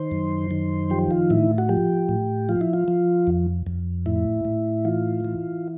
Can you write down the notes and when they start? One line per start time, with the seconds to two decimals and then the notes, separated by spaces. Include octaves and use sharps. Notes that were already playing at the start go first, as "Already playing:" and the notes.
Already playing: D#3 C5
0.11 F#2
0.51 D#3
0.90 F3 G4
1.11 F4
1.30 A2 E4
1.58 F#4
1.69 F3 G4
2.09 A2
2.49 F3 F4
2.61 E4
2.73 F4
2.88 F3
3.27 F2
3.67 F2
4.06 A2 E4
4.45 A2
4.85 E3 F4
5.24 E3